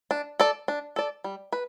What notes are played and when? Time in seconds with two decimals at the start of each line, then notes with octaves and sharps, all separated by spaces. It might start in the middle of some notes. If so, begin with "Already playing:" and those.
0.11 D4
0.40 A4 D5
0.68 D4
0.96 A4 D5
1.24 G3
1.53 B4